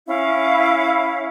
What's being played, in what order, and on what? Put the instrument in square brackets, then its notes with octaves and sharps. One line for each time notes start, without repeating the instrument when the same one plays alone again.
[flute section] C#4 E4 F5